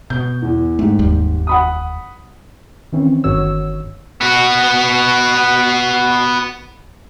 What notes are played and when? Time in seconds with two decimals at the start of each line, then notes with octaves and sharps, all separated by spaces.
0.10 B2 G6
0.42 E2
0.79 G#2 A3 G4
0.99 F1 D#2 G3
1.47 F#5 B5 D#6
2.92 D#3 E3 C4 C#4
3.24 G1 G2 D#3 F#4 C#5 E6
4.21 B3 F#4